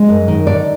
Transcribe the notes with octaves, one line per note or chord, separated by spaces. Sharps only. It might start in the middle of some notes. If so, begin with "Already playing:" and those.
Already playing: G#3
F#2
D#3
D3 D5